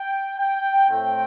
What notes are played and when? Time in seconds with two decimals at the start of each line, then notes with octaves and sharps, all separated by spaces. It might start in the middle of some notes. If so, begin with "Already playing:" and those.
Already playing: G5
0.37 G5
0.89 A2 A3 C4 G5